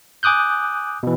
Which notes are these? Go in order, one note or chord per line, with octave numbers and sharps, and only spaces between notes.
G#5 D6 D#6 F#6 G6
B2 E3